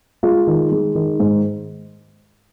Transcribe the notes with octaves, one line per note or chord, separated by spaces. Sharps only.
G#3 F4
D#3
G#3
D#3
G#2